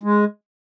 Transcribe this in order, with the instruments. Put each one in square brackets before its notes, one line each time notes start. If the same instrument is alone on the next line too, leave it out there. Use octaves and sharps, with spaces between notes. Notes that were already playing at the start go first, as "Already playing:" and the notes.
[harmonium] G#3